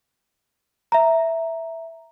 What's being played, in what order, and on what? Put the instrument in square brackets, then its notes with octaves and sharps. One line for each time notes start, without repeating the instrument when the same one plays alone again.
[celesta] E5 A#5